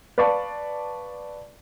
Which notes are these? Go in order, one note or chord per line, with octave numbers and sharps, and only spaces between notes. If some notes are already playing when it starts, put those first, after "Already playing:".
B4 D5 F5 A5 C#6